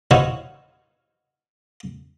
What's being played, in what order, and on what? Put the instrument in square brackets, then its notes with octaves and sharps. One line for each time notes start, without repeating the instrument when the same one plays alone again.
[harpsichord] D#4 E4 F#4 C5 C#5 F5